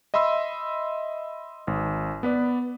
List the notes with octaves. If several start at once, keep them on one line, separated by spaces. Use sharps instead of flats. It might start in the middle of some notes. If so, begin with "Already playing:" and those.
D#5 E5 B5 C6 E6
G#1
B3 B4 D5